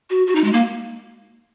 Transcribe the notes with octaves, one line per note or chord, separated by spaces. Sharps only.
F#4
F#4
D#4
G#3
A#3